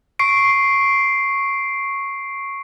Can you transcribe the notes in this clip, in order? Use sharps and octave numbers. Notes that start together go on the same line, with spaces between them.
C#6 C7 D7